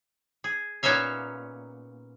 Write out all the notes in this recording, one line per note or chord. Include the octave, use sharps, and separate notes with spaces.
G#4
A#2 B3 C#4 D#4 E5 F5